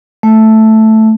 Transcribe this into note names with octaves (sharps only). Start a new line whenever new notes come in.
A3